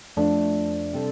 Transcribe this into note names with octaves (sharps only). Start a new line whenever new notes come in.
F2 F3 A3 D4
C3 G3 C4 A4